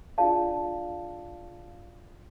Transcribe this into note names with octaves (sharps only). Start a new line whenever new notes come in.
D4 F4 G#4 D5 F5 A5